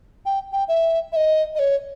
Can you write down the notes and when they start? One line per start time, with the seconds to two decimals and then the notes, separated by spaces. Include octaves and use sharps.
0.25 G5
0.52 G5
0.68 E5
1.12 E5
1.16 D#5
1.55 D#5
1.59 C#5